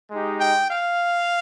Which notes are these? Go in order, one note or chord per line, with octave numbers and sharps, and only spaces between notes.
G#3 D#4 G4
G5
F5